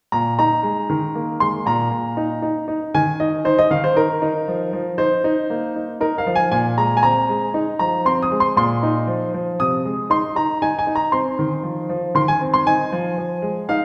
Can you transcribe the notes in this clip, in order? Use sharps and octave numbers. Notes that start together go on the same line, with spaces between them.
A#2 A#5
D#4 A#5
G#3
D#3
A#3
G#3 C6
A#2 A#5
A#2
D#4
D#4
D#4
D#3 G#5
D#4 D#5
D#4 C5
D#5
D#3 F5
C5
D#4 A#4
D#4
F3
F3
D#4 C5
D#4
A#3
D#4
D#4 A#4
F5
F3
G#5
A#2 G#5
G#3 A#5
G#5
C4 A#5
G#3
D#4
F3 A#5
C4 C6
D#6
G#3
C6
A#2 C6
D#4
F3
F3
C3 D#6
G#3
D#4 C6
D#4 A#5
D#4 G#5
G#5
D#4
A#5
C4 C6
D#3
F3
F3
D#3 C6
G#5
C4
C6
D#4 G#5
F3
F3
G#3
D#4 F5